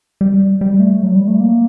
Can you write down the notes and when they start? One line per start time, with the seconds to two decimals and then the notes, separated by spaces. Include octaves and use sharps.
0.21 G3
0.61 G3
0.80 A3
1.03 F#3
1.16 G3
1.28 A3
1.41 A#3